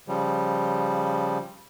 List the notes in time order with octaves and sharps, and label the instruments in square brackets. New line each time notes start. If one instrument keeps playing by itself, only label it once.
[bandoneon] C#3 F3 G3